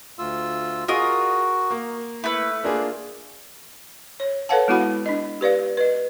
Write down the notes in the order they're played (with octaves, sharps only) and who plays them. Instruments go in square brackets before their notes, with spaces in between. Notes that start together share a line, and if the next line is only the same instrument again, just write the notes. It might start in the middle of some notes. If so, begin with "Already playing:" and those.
[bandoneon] D2 F4 E6
[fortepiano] F4 G#4 [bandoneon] F#4 [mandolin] A#4 D#5
[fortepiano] A#3
[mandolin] A3 B4 [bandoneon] E4
[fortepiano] A#3 D4 G#4 [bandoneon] F4
[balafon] C#5
A4 B4 C#5 F5 F#5 A5
G#3 B3 E4 F#4 F#5 B5
D4 D#5
G4 B4 D5 F5
B4 D#5